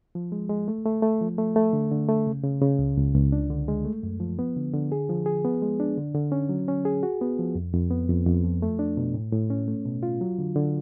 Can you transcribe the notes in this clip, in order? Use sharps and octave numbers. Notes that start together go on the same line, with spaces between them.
F3
G#3
G#3
A3
A3
A3
F3
A3
A3
D3
D3
A3
C#3
C#3
C#3
C#2
C#2
C#2
D4
D3
G#3
A3
F#2
F3
B3
D3
D3
G#4
F3
G#4
B3
G#3
D4
D3
D3
C#4
F#3
C#4
G#4
F#4
B3
F3
F2
F2
B3
F2
F2
F3
A3
D4
B2
A2
A2
C#4
A3
B2
F4
F#3
D3
D3